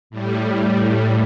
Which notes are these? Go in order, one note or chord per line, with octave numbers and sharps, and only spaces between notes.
A2 G3